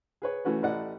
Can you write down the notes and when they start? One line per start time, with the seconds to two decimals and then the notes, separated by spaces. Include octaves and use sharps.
0.22 G#4 B4 C#5
0.45 E3 A3 C#4 F#4 B4
0.63 A1 A3 E4 D5 D#5 F#5